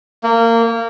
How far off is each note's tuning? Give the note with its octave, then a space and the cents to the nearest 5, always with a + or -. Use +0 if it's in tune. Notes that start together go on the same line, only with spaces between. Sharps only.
A#3 -20